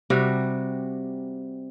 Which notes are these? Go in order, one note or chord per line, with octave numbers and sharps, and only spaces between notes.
C3 G3 F#4